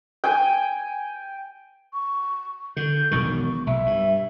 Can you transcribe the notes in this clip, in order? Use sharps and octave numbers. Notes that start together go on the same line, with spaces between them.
G5 G#5
C#6
D3 G6
E1 B1 D#3 C#6
B1 E5
G2